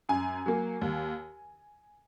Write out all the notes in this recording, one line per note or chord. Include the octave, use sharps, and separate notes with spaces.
F#2 G#5
F#3 A#3
D#2